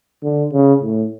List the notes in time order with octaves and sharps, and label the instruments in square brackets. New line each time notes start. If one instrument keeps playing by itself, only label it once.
[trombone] D3
C#3
A2